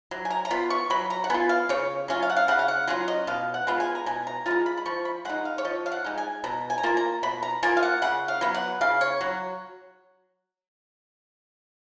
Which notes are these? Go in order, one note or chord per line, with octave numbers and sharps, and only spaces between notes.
F#3
G#5
A#5
A#5
B3 F4 B5
C#6
F#3 B5
A#5
F#5
B3 F4 G#5
F5
C#3 C#5
F#3 C#4 F4
F5
F#5
F5
C#3 F#5
F5
F#5
F#3 C#4 F4 F#5
D#5
B2 F5
F#5
G#3 B3 F4
G#5
A#5
B2 G#5
A#5
G#3 B3 F4 A#5
B5
B5
F3 C#6
B5
G#3 D#4 F#5
F5
C#5
F3 D#5
F5
F#5
G#3 D#4
G#5
B2 A#5
G#5
A#5
A#3 F4 G#5
A#5
B2 B5
A#5
A#3 F4 G#5
F5
F#5
C#3 F#5
F5
F#3 B3
F#5
C#3 F5
C#5
F#3 F#4